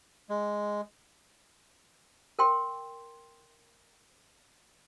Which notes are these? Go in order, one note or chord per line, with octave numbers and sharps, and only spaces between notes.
G#3
A#4 G5 C6